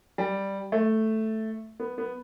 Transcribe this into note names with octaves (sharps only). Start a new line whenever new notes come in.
G3
A3
B3
B3